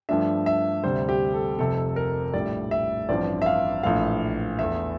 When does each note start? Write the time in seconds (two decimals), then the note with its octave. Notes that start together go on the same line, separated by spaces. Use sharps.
0.09 G2 F3 A3 D4 E5
0.46 E5
0.83 D2 C3 G3 C5
1.09 G4
1.34 A4
1.59 F1 F2 C3 A4
1.96 A#4
2.34 A#1 A2 G3 D5
2.71 E5
3.09 A1 G2 F3 C4 D5
3.42 E5
3.46 F5
3.83 A#1 A2 E3 F5
4.59 E2 E3 A3 E5